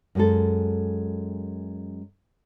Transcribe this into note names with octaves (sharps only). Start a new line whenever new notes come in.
F#2 G#3 A4